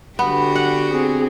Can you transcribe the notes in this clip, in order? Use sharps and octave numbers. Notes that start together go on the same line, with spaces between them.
D3 B3 F#4 G4
F#5
C4 G#4